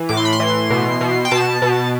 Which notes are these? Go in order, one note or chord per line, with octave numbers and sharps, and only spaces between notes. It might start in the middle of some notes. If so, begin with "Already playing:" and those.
Already playing: E3
A2 D6
C6
B5
C6
E3
B2
B2
G5
B2 A5
B2